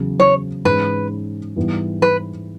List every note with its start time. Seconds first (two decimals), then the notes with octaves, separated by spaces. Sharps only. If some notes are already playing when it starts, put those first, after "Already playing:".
Already playing: E2 C#3 F#3
0.20 C#5
0.65 G#2 E3 G#3 C#4 B4
1.56 G#2 E3 G3 B3
2.02 B4